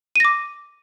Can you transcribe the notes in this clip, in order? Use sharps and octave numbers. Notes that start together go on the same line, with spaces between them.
D6 A#6 D#7